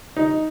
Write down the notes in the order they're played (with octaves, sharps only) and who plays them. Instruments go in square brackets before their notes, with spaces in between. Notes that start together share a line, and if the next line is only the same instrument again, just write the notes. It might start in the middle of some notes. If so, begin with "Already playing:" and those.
[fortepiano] D#4